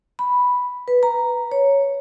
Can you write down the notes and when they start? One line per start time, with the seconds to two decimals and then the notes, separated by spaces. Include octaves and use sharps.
0.19 B5
0.88 B4
1.03 A#5
1.52 C#5